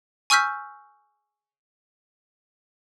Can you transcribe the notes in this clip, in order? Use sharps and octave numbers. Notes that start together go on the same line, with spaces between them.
G#5 C#6 E6 F6 G6 B6